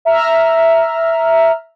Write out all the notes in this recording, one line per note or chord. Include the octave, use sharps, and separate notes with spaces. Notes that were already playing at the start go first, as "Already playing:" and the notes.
E5 A#5 F6